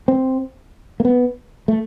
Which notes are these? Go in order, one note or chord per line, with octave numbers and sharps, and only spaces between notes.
C4
A#3
B3
A3